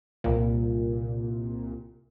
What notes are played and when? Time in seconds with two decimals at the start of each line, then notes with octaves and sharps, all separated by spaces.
0.24 C2 A#2